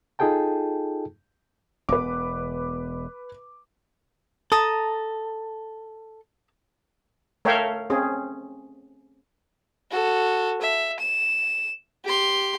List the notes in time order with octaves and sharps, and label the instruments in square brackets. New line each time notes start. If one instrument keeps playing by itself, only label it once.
[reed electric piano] D#4 F4 G#4 A4 G5 A5
[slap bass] E1 B3 [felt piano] B4 D6
[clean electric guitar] A4 [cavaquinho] A5 A#5 D#6
[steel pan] A3 A#4 C#5 E5 F5 G5
C4 C#4 G#4
[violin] F#4 A4
E5
E7
G4 C6